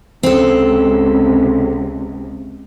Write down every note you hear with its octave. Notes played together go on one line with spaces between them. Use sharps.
C#2 C3 C4 A4